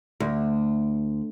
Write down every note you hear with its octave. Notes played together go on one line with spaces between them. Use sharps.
D2